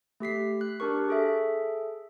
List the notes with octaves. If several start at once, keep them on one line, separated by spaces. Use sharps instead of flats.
A3 G4 B6 C7
F#6
D4 G4 A#4 C#6
G#4 A4 E5